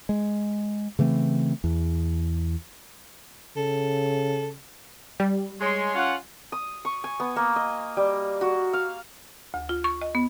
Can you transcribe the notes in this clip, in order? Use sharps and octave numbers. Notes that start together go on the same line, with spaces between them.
G#3
C#3 E3 A3 C4
E2
C#3 A4
G3
G#3 C#5 C6
C#4 F4 F#5
D#6
C#6
G#5
B3
A#3
D#5
G3
F#4
F5
D2
F4
C#6
D#5
B3